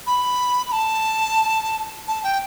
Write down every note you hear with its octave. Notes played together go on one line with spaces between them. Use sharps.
B5
B5
A5
A5
G5